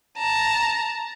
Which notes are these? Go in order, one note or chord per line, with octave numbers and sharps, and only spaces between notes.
A5 A#5